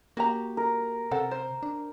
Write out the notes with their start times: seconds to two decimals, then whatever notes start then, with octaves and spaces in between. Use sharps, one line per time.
0.17 A#3 F#4 G4 A#5
0.57 A#4
1.11 C3 A4 C5 F#5
1.31 C5
1.63 D4